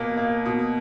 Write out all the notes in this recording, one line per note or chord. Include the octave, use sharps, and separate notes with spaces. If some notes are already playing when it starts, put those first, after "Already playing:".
Already playing: B2 A#3
A#3
B2